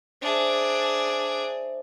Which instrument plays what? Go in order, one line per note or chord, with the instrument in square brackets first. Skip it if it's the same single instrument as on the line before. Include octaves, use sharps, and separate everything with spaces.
[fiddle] D4 G#4 [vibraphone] C5 D5 E5